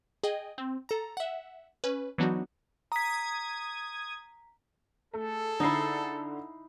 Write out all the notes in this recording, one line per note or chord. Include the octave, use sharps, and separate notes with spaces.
G#4 D#5 G5
C4
A4 A#5
E5 F#5
C#4 B4
E3 F#3 B3 D4 D#4 F#4
A#5 D#6 G#6 B6
A3 G#4 A4
D3 D#4 E4 C7